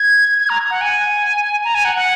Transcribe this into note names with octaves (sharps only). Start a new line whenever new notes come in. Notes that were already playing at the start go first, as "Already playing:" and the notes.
Already playing: G#6
G#6
A#5
F#5
G#5
A#5
G#5
F#5
F#5